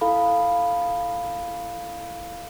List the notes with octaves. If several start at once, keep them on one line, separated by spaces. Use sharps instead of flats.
E4 A4 F5 B5